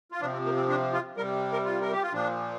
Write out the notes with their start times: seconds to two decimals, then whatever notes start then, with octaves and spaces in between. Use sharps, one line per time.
0.12 F4
0.21 C3 F3 D4
0.33 C4
0.45 A#3
0.57 C4
0.69 D4
0.93 F4
1.17 G3 A#4
1.21 C3
1.53 A#4
1.65 F4
1.81 A#4
1.92 G4
2.02 F4
2.13 A#2 F3 D4